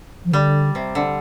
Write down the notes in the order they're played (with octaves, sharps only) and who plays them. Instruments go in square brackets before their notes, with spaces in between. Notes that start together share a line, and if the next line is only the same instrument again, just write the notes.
[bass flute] F3
[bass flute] D3 [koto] G3
[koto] C3
D3